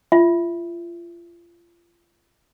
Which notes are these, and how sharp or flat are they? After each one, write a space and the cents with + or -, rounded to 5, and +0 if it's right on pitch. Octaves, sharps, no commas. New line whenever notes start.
F4 -30 E5 +0